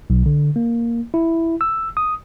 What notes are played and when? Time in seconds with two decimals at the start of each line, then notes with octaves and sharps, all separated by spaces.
0.10 B1
0.26 D3
0.56 A#3
1.14 E4
1.61 E6
1.97 D#6